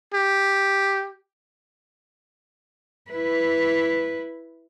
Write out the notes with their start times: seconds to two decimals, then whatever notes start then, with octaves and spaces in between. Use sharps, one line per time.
0.14 G4
3.11 E4 B4